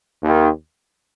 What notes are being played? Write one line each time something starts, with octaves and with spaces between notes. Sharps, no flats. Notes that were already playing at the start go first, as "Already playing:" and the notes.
D#2 D#3